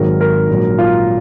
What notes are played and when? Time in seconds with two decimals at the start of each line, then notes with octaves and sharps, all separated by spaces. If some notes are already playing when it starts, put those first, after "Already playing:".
Already playing: G#1 G#2 D#3 F#3 A#4
0.21 A#4
0.49 A#1 G#2 F#3
0.79 F4